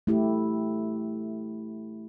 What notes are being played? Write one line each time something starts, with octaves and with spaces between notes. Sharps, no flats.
A3 E4 G4